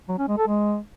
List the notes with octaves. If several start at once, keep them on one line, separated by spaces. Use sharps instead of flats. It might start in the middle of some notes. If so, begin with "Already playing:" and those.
F#3
C#4
G#3
A4
G#3